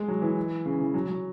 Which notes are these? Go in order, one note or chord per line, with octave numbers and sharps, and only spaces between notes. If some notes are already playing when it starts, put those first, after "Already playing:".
Already playing: G#3
F#3
E3
C#3
E3
F#3
F#3